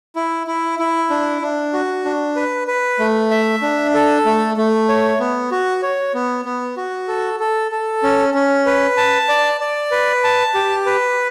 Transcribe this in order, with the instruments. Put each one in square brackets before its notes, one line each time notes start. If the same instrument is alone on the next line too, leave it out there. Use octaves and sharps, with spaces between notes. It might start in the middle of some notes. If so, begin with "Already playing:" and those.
[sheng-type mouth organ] E4
E4
E4
D4
D4
F#4
D4
B4
B4
A3
E5
D4
A4
A3
A3
C#5
B3
F#4
C#5
B3
B3
F#4
A4
A4
A4
C#4
C#4
B4
A5
D5
D5
B4
A5
G4
B4